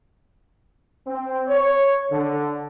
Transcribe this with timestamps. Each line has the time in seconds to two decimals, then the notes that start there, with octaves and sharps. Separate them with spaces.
1.07 C4
1.47 C#5
2.11 D3